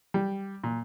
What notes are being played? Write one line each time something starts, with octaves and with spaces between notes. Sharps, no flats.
G3
A#2